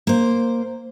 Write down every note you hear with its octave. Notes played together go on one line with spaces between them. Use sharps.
A#3 C5